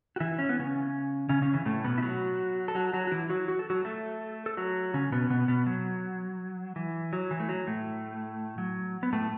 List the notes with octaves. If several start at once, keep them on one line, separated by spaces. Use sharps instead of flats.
F#4
E3 E4
C#4
B3
C#3 C#4
C#3 C#4
C#3 C#4
E3
A2 A3
B2 B3
E4
F#3 F#4
A4
F#3 F#4
F#3 F#4
F#4
E3 E4
F#3 F#4
F#4
A4
F#3 F#4
A3 A4
A4
F#3 F#4
C#3 C#4
B2 B3
B2 B3
B2 B3
F#3
E3
F#3
E3
A3
F#3
A2 A3
F#3
B3
A2 A3